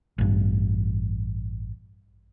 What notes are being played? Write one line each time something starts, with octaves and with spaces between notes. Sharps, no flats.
A1 G2